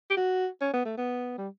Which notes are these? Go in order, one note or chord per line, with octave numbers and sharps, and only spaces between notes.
G4
F#4
C#4
B3
A3
B3
G3